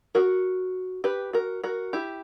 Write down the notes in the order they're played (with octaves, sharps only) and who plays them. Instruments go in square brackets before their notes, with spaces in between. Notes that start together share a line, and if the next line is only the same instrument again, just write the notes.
[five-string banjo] F#4 A#4
G4 B4
F#4 A#4
F#4 A#4
E4 G4